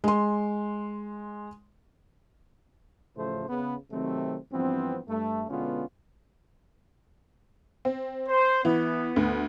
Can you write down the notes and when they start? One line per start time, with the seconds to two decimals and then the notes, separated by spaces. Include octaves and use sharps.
0.04 G#3 C6
3.16 A1 A2 C#3 F3 A3 C5
3.48 C#3 B3 B4
3.91 C3 D#3 F#3 A3 C4
4.52 G2 E3 F3 B3 C4
5.08 G2 A3
5.48 B2 D3 G#3 B3 C#4 F4
7.85 C4
8.28 C5
8.65 E3 B3
9.16 D2